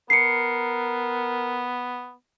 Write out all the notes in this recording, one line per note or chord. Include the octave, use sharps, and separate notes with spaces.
B3 A#4 C7 C#7